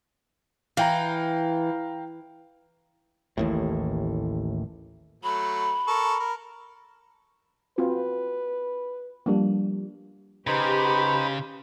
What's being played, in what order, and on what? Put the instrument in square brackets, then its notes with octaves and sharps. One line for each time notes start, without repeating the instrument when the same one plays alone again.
[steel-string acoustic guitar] E3 [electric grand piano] F5 G5 A#5
[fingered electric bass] A1 D#2 A2
[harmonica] F#3 A3 [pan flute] B5
[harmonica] A4 A#4 C#6
A#4
[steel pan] C4 F4 F#4 [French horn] B4
[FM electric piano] F3 G3 [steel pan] A#3 D4
[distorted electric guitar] C#3 [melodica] D#4 C5 B5 [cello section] G4 [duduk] B4